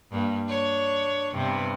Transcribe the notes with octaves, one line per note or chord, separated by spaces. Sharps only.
G2 A#3
D4 C#5
G2 C3 B3